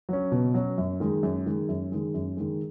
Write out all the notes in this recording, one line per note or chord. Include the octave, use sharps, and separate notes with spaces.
F#3 C#4
B2
F#3 C#4
F#2
D#3 G#3
F#2
D#3 G#3
F#2
D#3 G#3
F#2
D#3 G#3